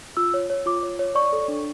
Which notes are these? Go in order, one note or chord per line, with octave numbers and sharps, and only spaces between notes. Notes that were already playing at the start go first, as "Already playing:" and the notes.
F4 E6
C#5
C#5
F4 D6
C#5
C#5
D5 C#6
A4
D4